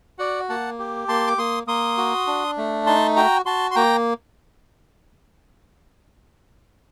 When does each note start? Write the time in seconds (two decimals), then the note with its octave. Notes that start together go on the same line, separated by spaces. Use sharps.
0.19 F#4 D5 F#5
0.49 A#3 F#5 A5
0.79 G4
1.08 A#3 A5 C6
1.27 D6
1.38 A#3 C6 D#6
1.67 A#3 C6 D#6
1.97 F#4
2.27 D4
2.58 A3
2.86 D#4 A5 C6
3.16 F#4 G5 A#5
3.46 F#4 A5 C6
3.71 C6
3.75 A#3 G5 A#5